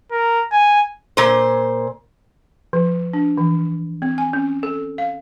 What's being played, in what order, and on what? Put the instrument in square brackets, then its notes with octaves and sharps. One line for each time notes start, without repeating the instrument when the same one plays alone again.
[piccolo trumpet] A#4
G#5
[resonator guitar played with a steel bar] A#2 C5
[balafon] F3
D4
E3
C4
G#5
C#4
A4
F5